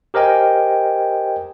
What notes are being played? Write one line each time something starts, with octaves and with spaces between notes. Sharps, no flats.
G4 A#4 C5 D#5 G5 G#5